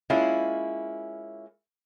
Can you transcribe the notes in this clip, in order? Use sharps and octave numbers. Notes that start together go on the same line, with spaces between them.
G#3 A#3 C#4 E4 F4